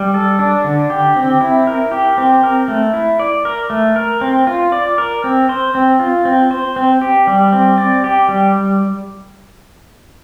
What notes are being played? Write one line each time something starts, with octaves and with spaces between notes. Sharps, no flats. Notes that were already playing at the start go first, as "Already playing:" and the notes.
Already playing: G3
A4
D4
D3
G4
C4
E4
A#4
G4
C4
A#4
A3
E4
D5
A#4
A3
A#4
C4
F4
D5
A#4
C4
C5
C4
F4
C4
C5
C4
G4
G3
C4
D5
G4
G3